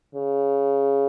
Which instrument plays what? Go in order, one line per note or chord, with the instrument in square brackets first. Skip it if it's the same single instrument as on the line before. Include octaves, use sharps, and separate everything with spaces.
[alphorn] C#3